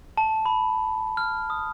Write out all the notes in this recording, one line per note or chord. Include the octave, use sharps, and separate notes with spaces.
A5
B5
F6
D#6